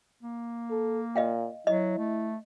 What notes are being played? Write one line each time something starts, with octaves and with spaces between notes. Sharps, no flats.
A#3
A4
A#2 D#5 F5 G5
F#3 E4 D#5
A3